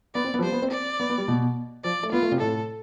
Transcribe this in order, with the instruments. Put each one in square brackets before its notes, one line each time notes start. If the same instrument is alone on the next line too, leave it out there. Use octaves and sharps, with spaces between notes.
[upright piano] B3 [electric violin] D5
[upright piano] C4
B3
F3
[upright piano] G3 [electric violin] C5
[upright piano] B3
C4
[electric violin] D5
[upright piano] B3
B3
G3
B2
[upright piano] F3 [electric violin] D5
[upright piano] A3
[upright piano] B3 [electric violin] F4
[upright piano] A3
C3
[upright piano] A2 [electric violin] A4